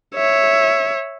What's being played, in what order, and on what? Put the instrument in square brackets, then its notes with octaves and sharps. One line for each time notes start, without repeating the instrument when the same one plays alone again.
[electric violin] C#5 E5